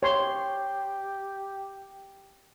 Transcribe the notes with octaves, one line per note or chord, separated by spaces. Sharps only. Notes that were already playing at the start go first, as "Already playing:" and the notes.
G4 C#5 C6